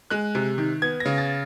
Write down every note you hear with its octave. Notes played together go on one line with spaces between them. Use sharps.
G#3 F#6
C3
D#3
B3 G#6
A#6
C#3
A6